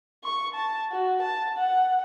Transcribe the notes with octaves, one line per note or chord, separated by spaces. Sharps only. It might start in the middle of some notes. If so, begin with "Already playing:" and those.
C#6
A5
F#4
A5
F#5